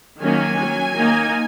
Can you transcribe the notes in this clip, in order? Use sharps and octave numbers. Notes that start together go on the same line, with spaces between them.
D#3 F#3 A#3 C#4 G#5
F#3 C#4
D#3 A#3 D#4